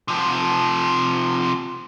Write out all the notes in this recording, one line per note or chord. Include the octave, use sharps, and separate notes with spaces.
C3 F3